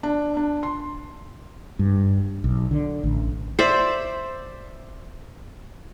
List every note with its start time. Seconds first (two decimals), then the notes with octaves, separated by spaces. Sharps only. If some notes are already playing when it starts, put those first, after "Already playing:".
0.03 D4
0.37 D4
0.63 C6
1.79 G2
2.44 B1
2.71 D3
3.03 A1
3.59 C5 D5 E5